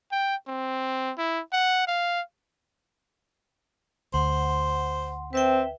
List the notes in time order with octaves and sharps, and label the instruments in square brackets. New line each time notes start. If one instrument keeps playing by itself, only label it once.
[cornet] G5
C4
E4
F#5
F5
[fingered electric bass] D2 [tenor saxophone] C5 [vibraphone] F#5 C6
[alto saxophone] C4 [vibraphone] B4 E5 G5